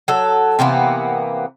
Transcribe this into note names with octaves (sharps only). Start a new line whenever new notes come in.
F#3 A4
C3 E3 A#3 B3